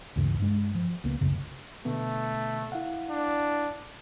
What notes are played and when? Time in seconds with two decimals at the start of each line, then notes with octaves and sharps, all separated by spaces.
0.16 D2 G2 C#3 E3
0.40 G2 G#3
0.75 F3
1.04 C#2 A#3 B3
1.21 F1 C2 F#2 C#3
1.85 B2 D3 A3 B3
2.72 E4 F5 F#5
3.10 D4